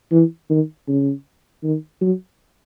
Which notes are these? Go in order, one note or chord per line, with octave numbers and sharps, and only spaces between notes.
E3
D#3
C#3
D#3
F#3